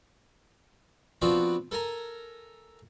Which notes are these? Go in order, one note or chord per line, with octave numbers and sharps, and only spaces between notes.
F3 B3 C4 D4 F4 F#4
A4 A#4 G#5 A#5